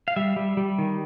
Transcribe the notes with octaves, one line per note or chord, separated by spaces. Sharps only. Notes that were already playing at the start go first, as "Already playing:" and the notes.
F5
G3 E5
G3
G3
D#3